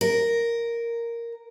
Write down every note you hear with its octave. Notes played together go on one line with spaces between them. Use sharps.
A#4